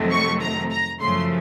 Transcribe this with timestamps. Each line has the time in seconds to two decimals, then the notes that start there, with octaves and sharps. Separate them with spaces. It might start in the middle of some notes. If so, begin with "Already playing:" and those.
Already playing: F2 C3 D#3 F#3 A3
0.11 C#6
0.41 A#5
0.71 A#5
1.00 F#2 C#3 F3 A3 C6